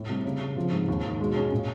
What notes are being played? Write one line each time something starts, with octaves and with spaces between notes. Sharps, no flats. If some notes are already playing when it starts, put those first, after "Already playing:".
Already playing: A2 A3
C3 G3
C#3
C#3
C3 F3
G#2
D#2
D#2
B2 G#3
B2
C#4
A#2 C#4